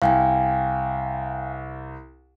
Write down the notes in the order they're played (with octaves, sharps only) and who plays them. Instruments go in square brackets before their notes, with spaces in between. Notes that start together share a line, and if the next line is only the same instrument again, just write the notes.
[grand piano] C2 [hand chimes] F5 G5 G#5